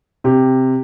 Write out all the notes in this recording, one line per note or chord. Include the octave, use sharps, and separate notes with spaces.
C3 G4